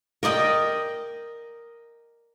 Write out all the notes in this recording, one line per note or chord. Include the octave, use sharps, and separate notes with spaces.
A#4 D5 D#5 G5